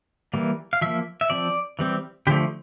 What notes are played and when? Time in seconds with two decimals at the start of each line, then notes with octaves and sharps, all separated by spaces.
0.34 E3 G3 A#3
0.73 F5
0.81 F3 A#3 E5
1.21 E5
1.30 F3 C4 D5
1.79 E3 G3 C4
2.27 D3 F3 A3 G4